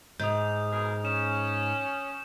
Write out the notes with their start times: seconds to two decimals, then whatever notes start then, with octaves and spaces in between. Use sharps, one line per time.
0.20 G#2 D#6 G6
0.72 B2 G#4 A#4
1.05 C#4 E7